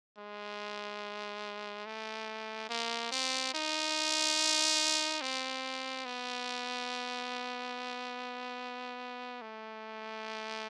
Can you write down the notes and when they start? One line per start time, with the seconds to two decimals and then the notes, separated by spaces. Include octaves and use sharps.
0.18 G#3
1.86 A3
2.69 A#3
3.12 C4
3.54 D#4
5.21 C4
6.05 B3
9.41 A3